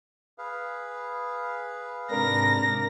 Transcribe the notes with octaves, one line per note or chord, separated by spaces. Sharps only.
G#4 B4 F5
G#2 C3 D4 A#4 A#6